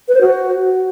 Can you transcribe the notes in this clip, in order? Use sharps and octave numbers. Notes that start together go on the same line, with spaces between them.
B4
C5
F#4